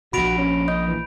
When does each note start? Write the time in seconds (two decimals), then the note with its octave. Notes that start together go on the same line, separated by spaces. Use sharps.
0.13 A#1 A#2 F#4 B5 D7 F7
0.38 C#4
0.68 D#5 G6
0.88 E3